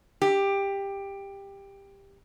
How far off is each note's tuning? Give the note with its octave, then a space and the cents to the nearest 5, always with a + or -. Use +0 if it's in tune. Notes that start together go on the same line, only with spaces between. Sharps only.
G4 +15